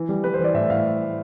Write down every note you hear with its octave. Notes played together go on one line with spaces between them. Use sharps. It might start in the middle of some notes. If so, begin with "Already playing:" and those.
Already playing: E3
G3
G3 B4
C5
E3
D5
A2 E5
A2 F5